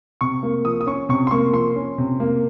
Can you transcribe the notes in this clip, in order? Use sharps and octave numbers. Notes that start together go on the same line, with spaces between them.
C3 C#6
A#3
F3 D#6
D#6
C#4 C#6
C3 C#6
C6
A#3 C#6
F3 C6
C#4
C3
A#3